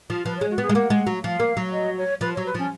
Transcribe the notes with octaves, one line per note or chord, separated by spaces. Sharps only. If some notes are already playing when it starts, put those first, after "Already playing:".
F3
F3 B4
C#5
G#3
F#4
B3 G#4
G#3
A#3 F#5
G#3
F#3
F3 F5
A#3
F#3
D#5
C#5
F3 B4
F#3 C#5
B4
F3 C#4